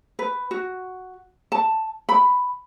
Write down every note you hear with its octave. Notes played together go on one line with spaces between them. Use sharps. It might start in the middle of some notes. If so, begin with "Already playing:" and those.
B4
F#4
A5
B5